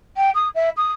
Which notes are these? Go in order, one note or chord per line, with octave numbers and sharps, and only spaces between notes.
G5
D#6
E5
D#6